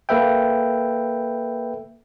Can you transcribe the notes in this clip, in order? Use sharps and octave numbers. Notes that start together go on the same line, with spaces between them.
A#3 A4 B4 E5 G5